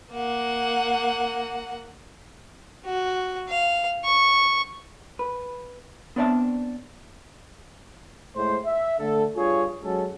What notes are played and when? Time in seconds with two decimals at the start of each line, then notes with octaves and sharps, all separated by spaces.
0.12 A#3 F#5
2.85 F#4
3.49 F5
4.04 C#6
5.19 B4
6.16 B3 C4 D4 D5 E5 A5
8.35 A2 G#3 C5
8.65 E5
8.99 D3 A3 A4
9.35 G2 F4 G#4 C#5
9.82 F#3 G#3 C#4 A4